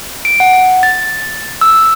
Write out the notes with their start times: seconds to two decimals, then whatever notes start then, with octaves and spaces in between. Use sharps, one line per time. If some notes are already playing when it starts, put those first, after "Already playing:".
0.25 D7
0.40 F#5
0.83 A6
1.61 E6